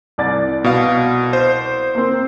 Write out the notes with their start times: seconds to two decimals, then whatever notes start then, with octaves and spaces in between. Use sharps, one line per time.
0.18 C2 D5 A6
0.64 B2 F5
1.33 C5
1.95 A#3 C4